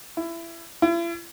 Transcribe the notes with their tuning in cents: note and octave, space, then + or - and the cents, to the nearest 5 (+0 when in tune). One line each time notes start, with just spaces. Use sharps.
E4 +25
E4 +45